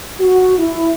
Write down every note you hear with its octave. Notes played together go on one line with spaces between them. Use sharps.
F#4
E4